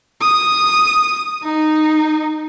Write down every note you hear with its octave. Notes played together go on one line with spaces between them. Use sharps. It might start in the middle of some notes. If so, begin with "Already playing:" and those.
D#6
D#4